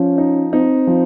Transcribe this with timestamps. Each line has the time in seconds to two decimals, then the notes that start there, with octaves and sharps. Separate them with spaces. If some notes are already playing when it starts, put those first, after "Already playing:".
Already playing: F3 C#4
0.18 D#4
0.53 C4 D#4
0.87 F3